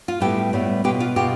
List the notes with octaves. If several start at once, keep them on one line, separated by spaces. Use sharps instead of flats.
F4
A2 G3 B3 E4 G4
A2 G3 B3 E4
B2 B3 F4 G4
F4
B2 B3 F4 G4